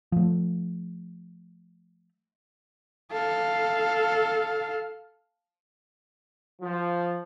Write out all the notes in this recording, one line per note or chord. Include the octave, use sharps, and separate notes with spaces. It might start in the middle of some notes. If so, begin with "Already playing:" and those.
F3 A3
A4 F5
F3